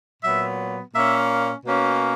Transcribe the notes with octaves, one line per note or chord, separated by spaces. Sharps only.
A#2 F#3 B3 E5
A#2 A#3 C#4 E5
B2 A#3 C#4